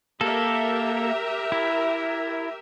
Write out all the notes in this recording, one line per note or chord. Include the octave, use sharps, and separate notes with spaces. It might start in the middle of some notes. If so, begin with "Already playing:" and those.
A#3 G4 A4 A#4 E5
E4